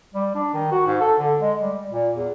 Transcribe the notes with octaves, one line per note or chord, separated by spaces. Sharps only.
G3
D4
D#3
F#4
G#2
A4
D3
G#3
G3
A#2
E2